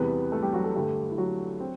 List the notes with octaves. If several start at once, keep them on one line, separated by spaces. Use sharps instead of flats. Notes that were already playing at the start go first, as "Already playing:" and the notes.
Already playing: E2 C3 E3 G3 B3 B4
A3 A4
G3 G4
F#3 F#4
A3 A4
G2 D3 G3 A3 G4
E4
F#3 F#4
C4